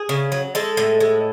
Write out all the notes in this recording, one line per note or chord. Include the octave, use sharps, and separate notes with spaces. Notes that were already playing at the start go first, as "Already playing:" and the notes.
Already playing: G#4
C#3
F#3
G#3 A4
A2
G#3